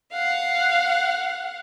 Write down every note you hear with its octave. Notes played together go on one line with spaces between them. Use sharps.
F5 F#5